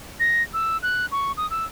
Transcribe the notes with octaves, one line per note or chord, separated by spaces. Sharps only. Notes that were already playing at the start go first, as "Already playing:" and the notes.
A#6
E6
F#6
C#6
D#6
E6